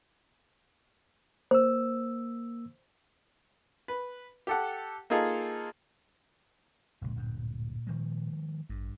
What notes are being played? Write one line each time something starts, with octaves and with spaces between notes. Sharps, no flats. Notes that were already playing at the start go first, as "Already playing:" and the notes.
A#3 C5 E6
B4
G4 A4 F#5
A#3 D#4 F4 G#4 A4 D#5
F1 C#2 A#2
D1 G2
D#3 F3 G#3
A1 G2